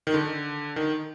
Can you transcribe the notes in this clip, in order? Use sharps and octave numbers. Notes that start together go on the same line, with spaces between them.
D#3
D3
D#3